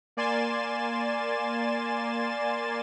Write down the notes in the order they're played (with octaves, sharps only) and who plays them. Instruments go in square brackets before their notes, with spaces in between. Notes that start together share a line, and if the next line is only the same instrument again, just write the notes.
[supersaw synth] A#3 D5 G#5 C6 A6 E7